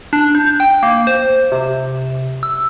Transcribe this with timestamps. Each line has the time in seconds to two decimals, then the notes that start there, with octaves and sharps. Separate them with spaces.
0.13 D4
0.35 G6
0.60 G5
0.83 A#3
1.07 C5
1.52 C3
2.43 E6